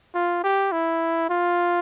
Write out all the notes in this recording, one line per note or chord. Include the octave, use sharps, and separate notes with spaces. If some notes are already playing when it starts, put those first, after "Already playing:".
F4
G4
E4
F4